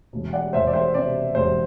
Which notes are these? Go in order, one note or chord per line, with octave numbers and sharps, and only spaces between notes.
E1
D5 F#5
E1 C5 E5
D5
C5 E5
C3 D5
E1 C5